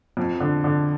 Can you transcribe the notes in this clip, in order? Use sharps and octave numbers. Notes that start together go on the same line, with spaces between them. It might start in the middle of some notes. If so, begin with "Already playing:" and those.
F2
D3
D3